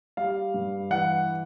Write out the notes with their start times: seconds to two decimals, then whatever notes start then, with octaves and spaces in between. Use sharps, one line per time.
0.17 G3 F5
0.54 G2
0.90 E3 F#5